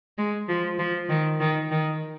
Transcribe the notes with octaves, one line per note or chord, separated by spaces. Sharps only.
G#3
F3
F3
D#3
D#3
D#3